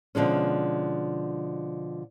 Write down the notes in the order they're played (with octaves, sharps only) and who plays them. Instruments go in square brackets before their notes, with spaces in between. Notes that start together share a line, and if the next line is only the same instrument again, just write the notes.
[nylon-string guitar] B2 D3 F3 G#3 C#4